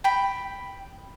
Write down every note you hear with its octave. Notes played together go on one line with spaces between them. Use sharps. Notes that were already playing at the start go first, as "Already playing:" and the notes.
G5 B5